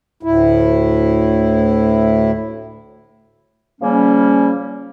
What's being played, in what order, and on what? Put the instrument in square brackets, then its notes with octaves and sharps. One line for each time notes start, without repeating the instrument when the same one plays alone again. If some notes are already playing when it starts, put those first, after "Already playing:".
[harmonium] D2 A2 E4
[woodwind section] C#3 F3 G3 A#3 C#4